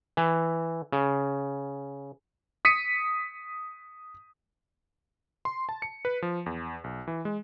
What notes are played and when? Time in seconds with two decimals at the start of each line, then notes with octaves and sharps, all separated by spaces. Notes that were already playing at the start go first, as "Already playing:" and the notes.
0.17 E3
0.92 C#3
2.65 D#6 B6 C#7 D#7
5.45 C6
5.69 A5
5.82 C#7
6.05 B4
6.22 F3
6.46 E2
6.84 B1
7.07 E3
7.25 G#3